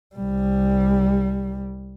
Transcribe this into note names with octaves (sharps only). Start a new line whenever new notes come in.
C2 G3